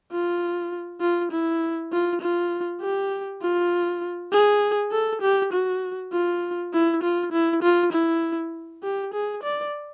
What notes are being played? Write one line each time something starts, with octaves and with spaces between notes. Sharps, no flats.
F4
F4
E4
F4
F4
G4
F4
G#4
A4
G4
F#4
F4
E4
F4
E4
F4
E4
G4
G#4
D5